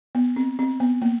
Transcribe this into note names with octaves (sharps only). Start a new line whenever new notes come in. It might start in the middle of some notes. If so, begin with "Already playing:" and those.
B3
C4
C4
B3
A#3